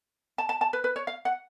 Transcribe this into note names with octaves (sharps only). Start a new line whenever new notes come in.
A5
A5
A5
B4
B4
C#5
F5
F#5